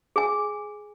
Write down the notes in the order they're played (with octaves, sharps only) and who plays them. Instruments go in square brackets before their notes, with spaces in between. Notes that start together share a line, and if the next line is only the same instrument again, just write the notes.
[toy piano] G#4 G#5